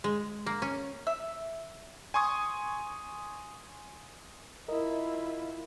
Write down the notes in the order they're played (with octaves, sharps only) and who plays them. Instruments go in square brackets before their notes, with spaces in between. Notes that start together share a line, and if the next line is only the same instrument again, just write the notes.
[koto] G#3
A#3
C#4
[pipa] E5
[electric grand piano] G#5 C6 C#6 D#6 G#6
[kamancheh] E4 F4 [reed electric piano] A#4 D#5